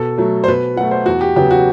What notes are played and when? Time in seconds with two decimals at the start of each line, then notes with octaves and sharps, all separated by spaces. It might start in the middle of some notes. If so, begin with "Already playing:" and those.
Already playing: B2 A4
0.18 F#3 A3
0.44 C5
0.48 B2 B4
0.76 F#3 A3 F#5
0.91 C5
1.06 E2 F#4
1.21 G4
1.36 C#3 F#3 B3 G4
1.51 F#4